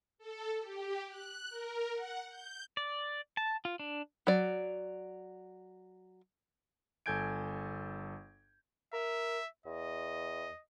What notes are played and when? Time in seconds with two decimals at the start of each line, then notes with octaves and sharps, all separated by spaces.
0.18 A4
0.60 G4
1.08 F#6
1.49 A#4
1.93 F#5
2.28 G6
2.77 D5
3.37 A5
3.65 F4
3.80 D4
4.27 F#3 D5
7.06 G1 A4 G#5 G6 G#6 D7
8.93 A#4 E5
9.66 E2 D#5